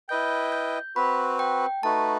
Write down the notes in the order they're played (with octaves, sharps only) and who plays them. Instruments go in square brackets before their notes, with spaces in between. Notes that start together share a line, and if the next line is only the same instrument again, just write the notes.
[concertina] E4 B4 D#5 G5 [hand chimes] G6
[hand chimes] G6
[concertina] C4 F#4 B4 [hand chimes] B5
[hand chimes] G5
[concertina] A3 D#4 F#4 B4 [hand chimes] A5